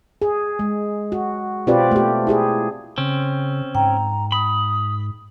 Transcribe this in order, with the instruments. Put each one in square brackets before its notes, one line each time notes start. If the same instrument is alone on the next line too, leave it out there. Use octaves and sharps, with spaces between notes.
[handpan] G#4
G#3
F#4
B2 C4 F4 G4 B4 D5
A3 G4
E4 G4 G#4
[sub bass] C#3 [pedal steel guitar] C4 C#4
[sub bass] G#2 [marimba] G5 [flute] A#5
[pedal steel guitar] B5 [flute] D#6